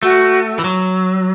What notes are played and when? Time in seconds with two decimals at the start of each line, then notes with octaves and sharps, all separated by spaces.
0.03 A3 F#4
0.59 E3
0.64 F#3